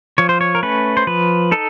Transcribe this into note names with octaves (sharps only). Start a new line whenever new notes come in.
F3 C#5
C5
C#5
A#4
A3 C#4 B4
C5
F3 B4
D#4 A4